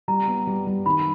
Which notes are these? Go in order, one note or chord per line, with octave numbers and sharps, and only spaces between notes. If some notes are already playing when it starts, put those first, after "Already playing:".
G3 A#5
B3
G3
G3
D#3 B5